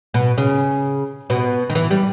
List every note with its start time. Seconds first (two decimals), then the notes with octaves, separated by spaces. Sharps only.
0.14 B2
0.38 C#3
1.30 B2
1.70 D#3
1.75 E3
1.90 G3